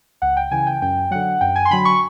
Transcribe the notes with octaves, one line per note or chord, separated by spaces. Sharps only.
C#2 F#5
G5
C#3 E3 G#5
G5
F#2 G5
D3 F#3 F#5
F#2 G5
G#5
C6
D3 F#3 B5
C#6